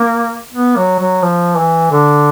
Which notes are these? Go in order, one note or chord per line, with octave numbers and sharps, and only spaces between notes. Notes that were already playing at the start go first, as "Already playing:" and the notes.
Already playing: A#3
B3
F#3
F#3
F3
E3
D3